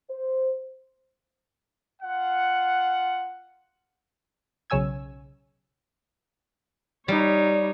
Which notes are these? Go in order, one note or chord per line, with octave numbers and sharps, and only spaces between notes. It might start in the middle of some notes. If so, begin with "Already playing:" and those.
C5
F4 F#5
B1 C#3 C#5 G#5 E6 G#6
G3 D#4 C#5